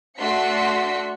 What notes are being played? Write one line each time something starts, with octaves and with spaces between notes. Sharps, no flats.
A3 D4 F#4 C6 B6 C#7